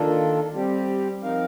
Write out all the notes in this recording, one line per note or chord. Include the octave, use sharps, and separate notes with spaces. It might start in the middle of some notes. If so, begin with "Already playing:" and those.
Already playing: D#3 A#3 D4 F4 A4
G3 C4 G4
F3 C4 D#4 A#4 F5